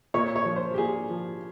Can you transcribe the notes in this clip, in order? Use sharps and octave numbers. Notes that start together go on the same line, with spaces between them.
A#2 C#5
C#5
F3
C5
G4
A#2 G#4
F3